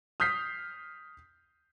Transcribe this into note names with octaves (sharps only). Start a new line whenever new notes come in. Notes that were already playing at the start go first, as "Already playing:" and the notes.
D#6 F6 G6 B6 C7